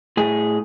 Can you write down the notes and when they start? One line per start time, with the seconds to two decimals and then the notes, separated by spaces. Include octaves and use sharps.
0.17 A2 G#4